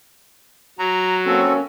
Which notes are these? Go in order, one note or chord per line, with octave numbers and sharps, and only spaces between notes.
F#3 A#5
A#3 C4 C#4 F#4 A4